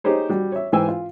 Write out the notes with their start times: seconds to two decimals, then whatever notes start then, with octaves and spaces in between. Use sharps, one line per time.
0.04 D#4 G4 G#4 C5 C#5
0.29 G3 F#4
0.52 C#5 E5
0.72 G#2 E3 C5 G5 G#5 E6
0.88 F4